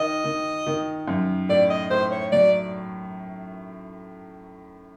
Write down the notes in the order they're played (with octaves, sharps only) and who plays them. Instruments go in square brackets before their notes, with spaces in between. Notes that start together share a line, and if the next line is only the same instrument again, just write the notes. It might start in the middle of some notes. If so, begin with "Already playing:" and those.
Already playing: [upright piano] D#3 [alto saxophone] D#5
[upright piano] D#3
D#3
F#2
[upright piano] A2 [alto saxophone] D5
[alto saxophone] D#5
[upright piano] A2 [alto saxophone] C5
[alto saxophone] C#5
[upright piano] F#3 [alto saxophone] D5